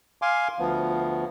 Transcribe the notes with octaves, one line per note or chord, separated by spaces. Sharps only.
F5 G#5 C6 D6
D2 F3 B3